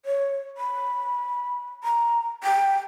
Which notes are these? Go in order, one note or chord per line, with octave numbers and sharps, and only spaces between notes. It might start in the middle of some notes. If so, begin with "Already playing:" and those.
C#5
B5
A#5
G5